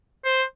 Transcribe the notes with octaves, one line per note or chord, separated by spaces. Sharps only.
C5